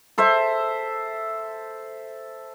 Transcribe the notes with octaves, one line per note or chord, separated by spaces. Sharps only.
A4 C5 E5